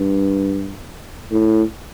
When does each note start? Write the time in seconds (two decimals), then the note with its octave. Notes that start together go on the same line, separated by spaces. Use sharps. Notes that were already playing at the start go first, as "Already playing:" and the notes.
Already playing: G2
1.31 A2